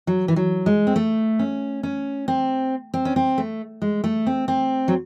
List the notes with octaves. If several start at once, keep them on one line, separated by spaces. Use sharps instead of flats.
F#3
E3
F#3
G#3
C4
A3
C#4
C#4
C4
C4
C#4
C4
A3
G#3
A3
C4
C4
F#3